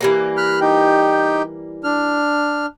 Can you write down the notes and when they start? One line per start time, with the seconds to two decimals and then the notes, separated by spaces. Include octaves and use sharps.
0.01 E3 G3 A#3
0.37 B5 F6 F#6
0.61 D#4 G4 G5
1.84 D4 F6